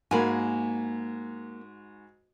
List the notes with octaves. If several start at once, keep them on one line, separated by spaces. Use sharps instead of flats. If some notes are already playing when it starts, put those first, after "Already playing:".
G#2 A#3 F#4 G#5 B5